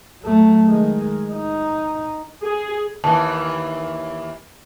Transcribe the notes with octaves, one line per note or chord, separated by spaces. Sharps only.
F#3 A3
D#3 G#3
D#4
G#4
D#2 E3 A5